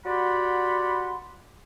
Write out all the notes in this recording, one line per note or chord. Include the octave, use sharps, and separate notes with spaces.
F#4 G4 D5 F#5 B5 C6